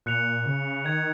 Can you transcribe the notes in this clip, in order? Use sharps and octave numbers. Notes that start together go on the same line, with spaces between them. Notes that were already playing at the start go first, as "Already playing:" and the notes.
A#2 F#6 C#7 F7
C#3
D#3 G#6 C#7 F7